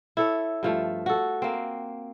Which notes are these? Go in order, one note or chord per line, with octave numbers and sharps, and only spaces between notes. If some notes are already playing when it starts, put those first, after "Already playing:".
E4 A4 C#5
G2 F3 A3
F#4 A4
A#3 C4